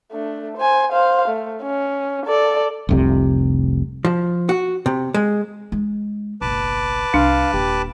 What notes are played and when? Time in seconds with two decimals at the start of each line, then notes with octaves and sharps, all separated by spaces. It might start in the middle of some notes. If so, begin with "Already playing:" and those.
0.12 A3 D4
0.57 C5 G#5
0.92 C5 F5
1.28 A3
1.62 C#4
2.26 A4 D5
2.89 F1 C2 C3
4.05 F3
4.49 F#4
4.86 C3
5.14 G#3
5.72 G#3 D#4
6.41 F#1 B1 B4 A5 D6
7.14 C2 D4 F5
7.53 D#1 E4 G4